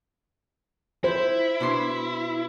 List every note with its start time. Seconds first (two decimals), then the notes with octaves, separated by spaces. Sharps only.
1.04 E4 C5
1.60 B2 D4 C6